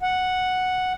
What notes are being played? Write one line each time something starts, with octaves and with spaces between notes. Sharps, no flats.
F#5